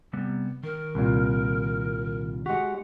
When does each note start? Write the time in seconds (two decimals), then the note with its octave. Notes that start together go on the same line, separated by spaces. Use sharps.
0.13 C3 G3 B3
0.63 D#3 A#4
0.95 C2 A#2
2.46 G#3 F#4 G4 F#5